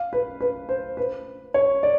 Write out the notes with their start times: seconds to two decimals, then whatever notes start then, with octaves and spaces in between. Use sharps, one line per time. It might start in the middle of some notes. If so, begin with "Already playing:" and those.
Already playing: F5
0.13 B4
0.41 B4
0.69 C5
0.97 B4
1.54 C#5
1.83 D5